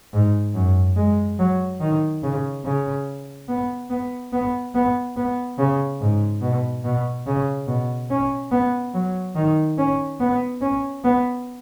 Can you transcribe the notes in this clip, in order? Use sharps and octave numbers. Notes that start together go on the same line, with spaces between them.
G#2
F#2
G#3
F#3
D#3
C#3
C#3
B3
B3
B3
B3
B3
C#3
G#2
B2
B2
C#3
B2
C#4
B3
F#3
D#3
C#4
B3
C#4
B3